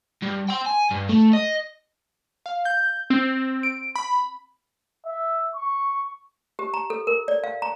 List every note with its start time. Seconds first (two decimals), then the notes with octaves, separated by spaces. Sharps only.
0.22 G2
0.48 G5 C6
0.66 G#5
0.91 G2
1.09 A3
1.33 D#5
2.46 F5
2.65 G6
3.10 C4
3.63 D7
3.96 B5
5.05 E5
5.54 C#6
6.59 G4
6.74 A#5
6.90 A4
7.07 A#4
7.28 D5
7.44 F5
7.62 A#5